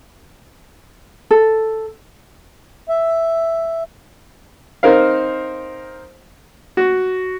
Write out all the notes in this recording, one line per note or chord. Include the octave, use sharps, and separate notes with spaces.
A4
E5
C4 D#4 A#4 C5 F5
F#4